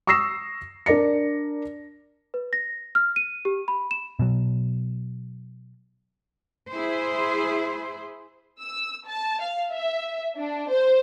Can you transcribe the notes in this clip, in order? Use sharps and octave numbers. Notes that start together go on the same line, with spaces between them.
C#6 D#6 E6 A#6 C7 E7
D4 A#4 D5 A#6 C#7
B4
A#6
F6
D#7
G4
B5
E7
B2 F#3
E4 G#4 C5
E6
A5
F5
E5
D4
C5